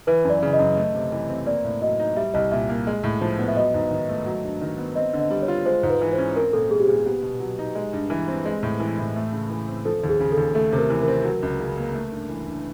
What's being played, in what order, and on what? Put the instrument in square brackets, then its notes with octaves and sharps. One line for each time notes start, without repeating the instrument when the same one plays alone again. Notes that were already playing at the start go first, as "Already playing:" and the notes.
[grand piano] E3 [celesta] B4
[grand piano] F#2
[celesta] D5
[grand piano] C#3
[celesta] D#5
[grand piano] F#2
A3
C3
E3
C4
[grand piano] A#3 [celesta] D5
[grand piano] A2
[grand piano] F#3 [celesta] D#5
[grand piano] D#4
[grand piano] G3 [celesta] E5
[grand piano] C2 [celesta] D#5
[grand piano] A#2 [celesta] E5
[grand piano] A#3
G#3
A2
F3
B3
[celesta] E5
[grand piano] F#3 [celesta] D#5
[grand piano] G#2
D#3
A3
F#3
G2
D#3
B3
[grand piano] C4 [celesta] D#5
[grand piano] D3
[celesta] D#5
[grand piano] G3
[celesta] C#5
[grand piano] F4
[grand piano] G#3 [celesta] C5
[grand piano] G#2
[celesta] B4
[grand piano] E3
[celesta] C5
[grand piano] C#4
[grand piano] C4 [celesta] A#4
[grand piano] A#2 [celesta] A4
[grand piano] G3 [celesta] G#4
[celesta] G4
[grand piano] A#2 [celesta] G#4
[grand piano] B3 [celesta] G4
[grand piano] B2
F#3
D#4
G#3
G2
E3
C4
G#3
A2
E3
A2
A3
C#3
E3
C4
[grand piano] F3 [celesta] A4
[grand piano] D#2
[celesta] G#4
[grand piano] C#3
[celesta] A4
[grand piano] D#2
[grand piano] A3 [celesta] A4
[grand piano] C3
[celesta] A#4
[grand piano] E3
[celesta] A#4
[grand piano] C4
F#3
C#2
C#3
A#3
A3
G2
E3
G2